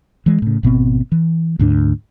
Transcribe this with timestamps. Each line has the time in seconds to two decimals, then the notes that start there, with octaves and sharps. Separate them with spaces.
0.26 E3 G#3
0.42 A2 C#3
0.63 G#1 B2 B3 C4
1.12 E3
1.59 D2 G#2 B3 D4